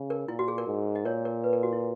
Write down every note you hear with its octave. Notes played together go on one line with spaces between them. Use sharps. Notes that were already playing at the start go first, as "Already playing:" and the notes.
Already playing: C#3
A#4
A#2 E4
F#4
G#4
A#4
G#2
D#5
A#2 A#4 C#5
A#4
B4
A#4
F#4
E4